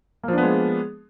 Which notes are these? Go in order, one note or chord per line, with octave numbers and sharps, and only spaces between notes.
F3 G#3 A#3 B3 D4